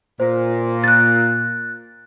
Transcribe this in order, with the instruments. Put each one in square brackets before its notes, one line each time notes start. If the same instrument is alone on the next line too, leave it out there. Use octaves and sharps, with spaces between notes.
[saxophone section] A#2 [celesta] C5
[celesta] F#6 A6